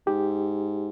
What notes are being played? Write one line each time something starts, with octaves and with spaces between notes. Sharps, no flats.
G#2 G4